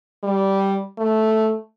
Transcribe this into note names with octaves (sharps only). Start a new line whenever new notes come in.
G3
A3